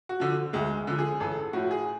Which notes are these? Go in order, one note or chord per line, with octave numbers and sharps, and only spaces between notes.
F#4
D3 F3
D2 G#3
D3 F3
G#4
A1 A4
A2 F3 F#4
G#4